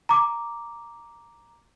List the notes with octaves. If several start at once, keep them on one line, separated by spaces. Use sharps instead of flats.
A#5 D6